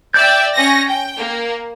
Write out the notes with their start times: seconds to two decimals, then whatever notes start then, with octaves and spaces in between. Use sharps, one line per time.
0.14 D5 E5 G5 G6
0.56 C#4 A#6
0.87 G5
1.18 A#3